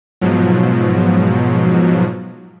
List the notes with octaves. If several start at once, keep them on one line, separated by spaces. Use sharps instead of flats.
G#2 B2 F3 F#3